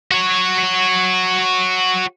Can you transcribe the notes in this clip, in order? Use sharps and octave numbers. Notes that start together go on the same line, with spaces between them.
F#4 C#5